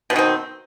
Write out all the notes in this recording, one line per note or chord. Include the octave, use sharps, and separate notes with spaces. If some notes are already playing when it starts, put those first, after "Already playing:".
B2 D#3 C4 C#4